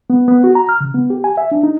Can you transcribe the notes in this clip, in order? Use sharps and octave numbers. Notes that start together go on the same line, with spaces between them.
B3
B3
F#4
A#5
F6
C#3
B3
G4
G#5
E5
D4
D#4